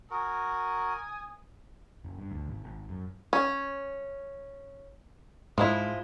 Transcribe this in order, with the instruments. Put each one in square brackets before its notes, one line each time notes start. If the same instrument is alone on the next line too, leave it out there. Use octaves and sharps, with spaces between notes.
[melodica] F#4 A#4 [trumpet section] G#5 D#6
[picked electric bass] F#1
G2
D2
G#1
G#1
F#2
[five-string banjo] C#4
[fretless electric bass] G#2 [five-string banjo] F3 G#3 E4